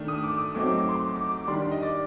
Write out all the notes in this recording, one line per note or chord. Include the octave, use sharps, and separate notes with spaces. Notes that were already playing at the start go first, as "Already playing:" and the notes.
Already playing: D#3 A3 D4
D#6
D6
D#6
F#3 A3 C4 D#4 D6
D6
D6
C6
D6
D6
D6
D#3 G3 D4 C6
D5
D#5
D5